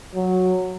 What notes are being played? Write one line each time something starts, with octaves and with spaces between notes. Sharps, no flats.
F#3